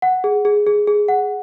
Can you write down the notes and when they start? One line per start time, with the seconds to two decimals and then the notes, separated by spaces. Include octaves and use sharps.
0.02 F#5
0.24 G#4
0.45 G#4
0.67 G#4
0.88 G#4
1.08 F#5